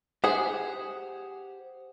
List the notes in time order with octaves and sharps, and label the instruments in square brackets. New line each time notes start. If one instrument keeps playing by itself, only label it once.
[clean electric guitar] G4 C5 F#5 [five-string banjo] G#4